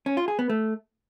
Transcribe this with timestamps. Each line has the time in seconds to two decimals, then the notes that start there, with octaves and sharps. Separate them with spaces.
0.06 C#4
0.17 F4
0.28 G#4
0.39 B3
0.50 A3